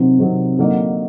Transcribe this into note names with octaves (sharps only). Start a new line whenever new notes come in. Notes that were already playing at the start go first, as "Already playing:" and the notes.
Already playing: C3 D#3 F#3
C3 D#3 F#3
D3 F#3 A#3 D#4